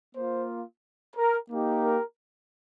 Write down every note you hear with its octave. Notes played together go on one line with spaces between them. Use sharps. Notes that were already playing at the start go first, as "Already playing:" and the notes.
A#3 F4 C5
A#4
A#3 D#4 G4
A#4